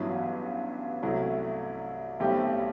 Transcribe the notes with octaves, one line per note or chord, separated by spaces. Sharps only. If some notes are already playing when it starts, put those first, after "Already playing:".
Already playing: A1 G2 F#3 B3 E4
C2 C3 F#3 A3 E4
B1 A2 G3 C4 G4